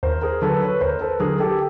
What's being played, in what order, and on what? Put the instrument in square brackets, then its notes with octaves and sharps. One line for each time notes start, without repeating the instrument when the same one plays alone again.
[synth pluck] D#2 [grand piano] A#4 C5
[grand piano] G#4 A#4
[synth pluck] D3 F#3 [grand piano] A4 B4
[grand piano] B4 C#5
[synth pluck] D#2 [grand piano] A#4 C5
[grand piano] A4 B4
[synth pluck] D3 F#3 [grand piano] G#4 A#4
[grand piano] G4 A4